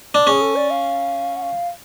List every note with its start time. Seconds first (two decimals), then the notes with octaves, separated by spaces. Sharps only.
0.14 D4
0.27 C#4 G#4
0.41 A4
0.56 D5
0.71 F5
1.36 F#5
1.42 F5